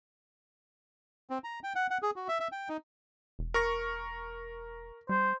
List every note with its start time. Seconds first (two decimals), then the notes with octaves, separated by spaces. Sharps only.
1.30 C4
1.44 A#5
1.64 G5
1.75 F#5
1.90 F#5
2.02 G#4
2.16 F#4
2.28 E5
2.40 E5
2.52 G5
2.69 D#4
3.39 E1
3.54 A#4 C#6 A#6
5.09 G3 C5